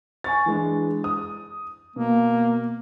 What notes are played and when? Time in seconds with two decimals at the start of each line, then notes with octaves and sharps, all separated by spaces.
0.24 G#5 C#6 A6
0.46 E3 G#3 D4
1.04 D#6
1.96 B2 A#3